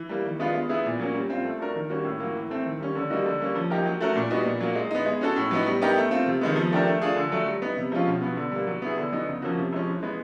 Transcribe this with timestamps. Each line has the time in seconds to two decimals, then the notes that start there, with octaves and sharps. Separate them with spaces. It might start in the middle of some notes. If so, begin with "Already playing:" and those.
Already playing: E3
0.09 G3 A#3
0.25 D#3
0.39 G#3 B3 D4 F4
0.54 G#3
0.69 B3 E4 G#4
0.85 A#2
0.99 F#3 A#3 C#4
1.14 G3
1.30 C4 F4
1.45 A3
1.60 D4 F#4 A#4
1.75 D#3
1.90 G3 A#3 C#4 F#4
2.04 A2
2.20 F#3 A#3
2.35 E3
2.50 A3 C4
2.65 D#3
2.80 G3 A#3 C#4
2.95 D3
3.10 G3 A#3 D#4 F#4
3.25 D3
3.41 G3 A#3 C#4
3.56 F3
3.70 A#3 D#4 G4 A#4
3.85 F#3
4.01 A3 C#4 F#4 A#4
4.16 A#2
4.30 G3 B3 D#4 F#4
4.46 A#2
4.60 F#3 A#3
4.76 G#3
4.91 B3 D#4
5.06 G#3
5.21 C#4 F#4 A4
5.36 A2
5.51 F#3 B3 D#4
5.66 G3
5.81 B3 D#4 G4 A#4
5.96 A3
6.11 C4 F4
6.26 C3
6.41 D#3 G#3 B3
6.56 F3
6.71 A3 D4 G4 A#4
6.86 A3
7.01 D4 F4 G#4
7.16 D3
7.32 F#3 A3
7.46 G3
7.62 B3 D#4
7.77 C3
7.92 F3 G#3 C#4 F4
8.07 B2
8.22 F#3 B3
8.37 D3
8.52 G3 A#3
8.67 F#3
8.82 B3 E4 G#4
8.97 D3
9.12 F#3 B3 D#4
9.27 C#3
9.42 F3 A#3 C#4 F#4
9.57 C3
9.72 F3 G#3 C#4
9.87 E3
10.03 G#3 B3